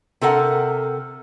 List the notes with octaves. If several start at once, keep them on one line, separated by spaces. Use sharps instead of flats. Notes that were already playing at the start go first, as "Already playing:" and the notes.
C3 A4 A#4 F#5